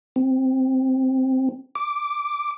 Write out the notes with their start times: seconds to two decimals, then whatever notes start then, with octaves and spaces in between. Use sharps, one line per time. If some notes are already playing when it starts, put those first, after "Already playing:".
0.16 C4
1.75 D6